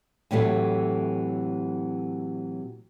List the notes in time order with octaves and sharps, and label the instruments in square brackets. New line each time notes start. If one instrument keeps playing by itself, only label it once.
[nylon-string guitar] A2 C3 E3 F#3 A3